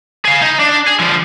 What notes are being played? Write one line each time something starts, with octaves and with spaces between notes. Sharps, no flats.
G#4 F5
D#4
D4
G#4
D3 F3